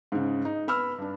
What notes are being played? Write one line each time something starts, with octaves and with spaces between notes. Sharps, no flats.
G#2 C#3
D#4
B3 B5 E6 F6
G2 D4